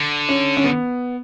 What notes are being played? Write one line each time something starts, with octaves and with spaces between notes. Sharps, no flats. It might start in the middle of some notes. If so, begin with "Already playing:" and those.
Already playing: D3
C#4
C#4
B3